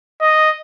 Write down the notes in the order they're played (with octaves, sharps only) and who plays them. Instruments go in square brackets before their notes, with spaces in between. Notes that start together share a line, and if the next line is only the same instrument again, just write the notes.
[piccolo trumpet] D#5